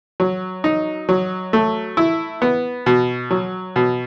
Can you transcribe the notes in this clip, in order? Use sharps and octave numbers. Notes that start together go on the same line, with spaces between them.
F#3
D#4
F#3
A3
E4
B3
B2
F#3
B2